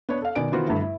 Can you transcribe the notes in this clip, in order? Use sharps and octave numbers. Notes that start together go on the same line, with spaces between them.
B3 D4 C#5
A4 F5
B2 D#3 D5 G#5 D7
D#3 E3 B3 F4 F#4 C5
G2 D3 G3 A3 E4
E4